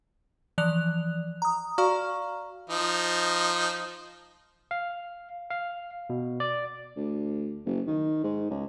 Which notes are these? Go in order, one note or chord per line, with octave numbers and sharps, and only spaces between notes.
E3 F3 D5 F#6 F7
A#5 D#6
F#4 D5 F5 A#5 C#6 F6
F3 D#4
F5
F5
B2
D5
D2
F#1
D#3
G#2
C#2